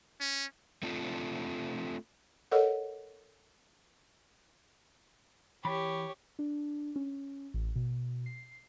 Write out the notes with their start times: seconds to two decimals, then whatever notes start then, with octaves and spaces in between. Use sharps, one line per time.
0.20 C#4
0.83 A3 C4 D4 F4
2.51 A4 A#4 C#5 D#5 F#5
5.65 E3 G4 C#5 B5
6.39 D4
6.96 C#4
7.54 A1
7.76 B2
8.26 C7